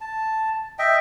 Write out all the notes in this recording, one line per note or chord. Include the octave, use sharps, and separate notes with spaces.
A5
D#5 E5 G5